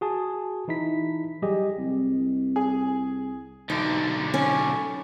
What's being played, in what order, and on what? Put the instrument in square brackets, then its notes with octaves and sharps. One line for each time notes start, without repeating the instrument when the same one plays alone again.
[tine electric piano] F#4 G#4 A5
E3 D#4 E4 B6
F#3 G3 G4 G#4 D#5
[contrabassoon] C2
[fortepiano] G#4
[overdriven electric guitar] B1 D3 [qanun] D#4
[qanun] C#4